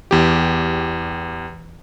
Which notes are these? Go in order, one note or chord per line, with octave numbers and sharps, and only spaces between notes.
E2 G4